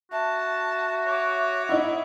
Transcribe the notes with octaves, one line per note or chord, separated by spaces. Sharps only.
F#4 E5 A5
C#5 D6
D#4 E4 F#5